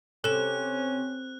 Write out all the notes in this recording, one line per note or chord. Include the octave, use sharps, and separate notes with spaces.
C3 C#4 A4 F#6 E7